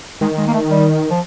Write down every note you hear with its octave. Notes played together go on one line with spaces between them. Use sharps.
D#3 G#3
G#3
A#3
A3
G3
F3